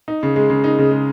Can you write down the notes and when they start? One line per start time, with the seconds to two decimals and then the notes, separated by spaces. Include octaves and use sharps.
0.08 D#4
0.23 C#3
0.36 G#3
0.50 C#3
0.64 D#4
0.78 C#3
0.91 G#3